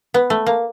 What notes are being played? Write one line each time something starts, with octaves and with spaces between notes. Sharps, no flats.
B3
A3
A#3